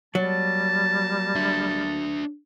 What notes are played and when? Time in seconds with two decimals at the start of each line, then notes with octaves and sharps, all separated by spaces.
0.15 F#3 G3 A#3 A5
1.35 D4 E5